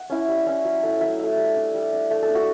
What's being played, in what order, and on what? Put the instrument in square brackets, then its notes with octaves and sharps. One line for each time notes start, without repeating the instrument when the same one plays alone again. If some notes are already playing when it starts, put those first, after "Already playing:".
Already playing: [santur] F#5
C#4 E4
G3
C#4 E4
F#3
A3 E4
F#3 E5
A3 E4
G3
D4
G3
D4
A3
A4
D4
F#4